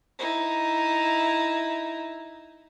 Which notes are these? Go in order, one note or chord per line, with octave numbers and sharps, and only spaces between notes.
D#4 E4